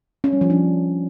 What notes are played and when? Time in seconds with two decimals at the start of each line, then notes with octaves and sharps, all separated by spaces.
0.24 C#4
0.33 G3
0.41 F3
0.50 D4